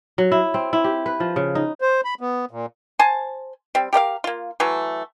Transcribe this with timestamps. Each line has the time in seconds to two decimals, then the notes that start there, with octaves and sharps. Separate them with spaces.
0.18 F#3
0.32 E4
0.54 C4
0.73 E4
0.84 G4
1.06 B4
1.20 F3
1.36 C#3
1.55 D#4
1.81 C5
2.05 B5
2.21 B3
2.51 A#2
2.99 C5 G#5 A5
3.75 G3 C4
3.93 G4 A#4 D#5 F5
4.24 A#3 F4
4.60 E3 F#3 A3